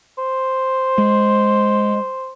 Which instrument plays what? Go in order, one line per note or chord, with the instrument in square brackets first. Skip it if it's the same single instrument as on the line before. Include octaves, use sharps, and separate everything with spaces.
[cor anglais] C5
[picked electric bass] G#3